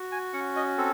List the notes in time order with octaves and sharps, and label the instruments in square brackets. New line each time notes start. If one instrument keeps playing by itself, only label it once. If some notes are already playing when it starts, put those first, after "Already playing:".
Already playing: [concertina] F#4
G#5
C#4 F#5
D#5
C4 A4